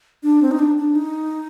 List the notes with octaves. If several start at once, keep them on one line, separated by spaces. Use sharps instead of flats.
D4
C4
D#4
D4
D4
D#4